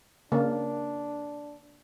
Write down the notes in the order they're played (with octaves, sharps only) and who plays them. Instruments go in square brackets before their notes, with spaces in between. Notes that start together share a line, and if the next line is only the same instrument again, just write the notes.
[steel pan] C#3 A#3 [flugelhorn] D4